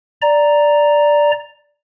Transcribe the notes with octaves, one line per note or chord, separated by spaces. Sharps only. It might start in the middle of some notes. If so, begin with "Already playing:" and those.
D5 A#5